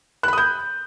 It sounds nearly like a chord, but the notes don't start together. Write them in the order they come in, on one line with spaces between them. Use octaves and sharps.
F#6 B5 D#6 G6